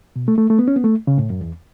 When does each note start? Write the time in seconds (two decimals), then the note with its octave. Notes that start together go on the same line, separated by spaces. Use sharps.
0.16 B2
0.28 A3
0.38 A3
0.50 A3
0.59 B3
0.68 C#4
0.76 B3
0.84 A3
1.07 C#3
1.18 A2
1.30 F#2
1.41 E2